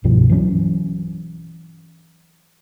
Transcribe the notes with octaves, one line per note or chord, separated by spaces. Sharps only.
C2 G2 B2 F3
E3 F#3 A#3 C#4